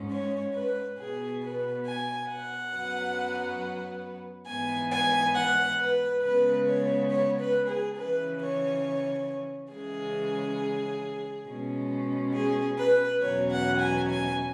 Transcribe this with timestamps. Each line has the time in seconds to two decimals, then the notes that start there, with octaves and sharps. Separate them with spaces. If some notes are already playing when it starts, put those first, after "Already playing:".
Already playing: G#2 G#3 C#4
0.12 C#5
0.55 B4
0.98 B2 B3 G#4
1.43 B4
1.87 G#5
2.29 F#5
2.74 F#2 F#3 B3
4.48 G#2 E3 B3 G#5
4.92 G#5
5.36 F#5
5.79 B4
6.23 C#3 G#3 B3 B4
6.68 C#5
7.11 C#5
7.40 B4
7.69 G#4
7.99 C#3 E3 C#4 B4
8.41 C#5
9.72 C#3 E3 G#3 C#4 G#4
11.48 B2 G#3 C#4
12.35 G#4
12.79 B4
13.22 E2 B2 F#3 C#4 C#5
13.51 F#5
13.81 G#5
14.11 G#5